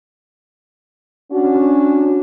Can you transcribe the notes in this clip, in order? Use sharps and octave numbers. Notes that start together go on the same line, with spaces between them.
C#4 D4 F#4